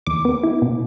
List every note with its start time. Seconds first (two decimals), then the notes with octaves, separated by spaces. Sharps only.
0.07 E2 D6
0.25 B3
0.43 E4
0.62 B2